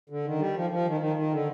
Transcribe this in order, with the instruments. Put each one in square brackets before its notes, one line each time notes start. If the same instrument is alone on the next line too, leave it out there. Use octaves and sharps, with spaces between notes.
[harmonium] D3
D#3
G3
F3
F3
D#3
D#3
D#3
D3